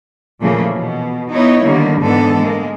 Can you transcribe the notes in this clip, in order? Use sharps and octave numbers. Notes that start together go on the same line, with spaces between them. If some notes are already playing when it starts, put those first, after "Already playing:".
A#2 C#3 E3 F3 A3 A#3
B2
B3 D#4 E4 C#5
D3 D#3 G3 A#3
G#2 D3 E3 B3 A4
G#3 A#3